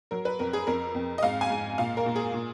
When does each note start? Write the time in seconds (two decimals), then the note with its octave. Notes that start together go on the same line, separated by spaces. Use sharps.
0.11 F#3 A#4
0.25 B4
0.39 F2 A#4
0.53 G#4
0.67 F2 A#4
0.95 F2
1.18 D#5
1.23 G#2 F5
1.41 G#5
1.50 G#2
1.78 A#2 F5
1.97 A#4
2.06 A#2
2.16 G#4
2.34 A#2